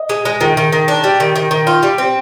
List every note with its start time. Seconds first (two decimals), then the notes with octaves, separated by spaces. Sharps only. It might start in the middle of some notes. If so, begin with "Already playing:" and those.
Already playing: D#5
0.10 G#3
0.25 G#3
0.41 D#3 G#4
0.57 D#3
0.73 D#3
0.88 D4
1.04 G3
1.20 D#3
1.36 D#3
1.51 D#3
1.67 F4
1.83 G3
1.98 C4